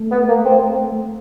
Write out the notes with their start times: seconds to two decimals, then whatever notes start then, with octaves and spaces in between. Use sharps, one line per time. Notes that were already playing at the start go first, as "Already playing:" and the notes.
Already playing: A3
0.11 B3
0.28 A#3
0.45 C4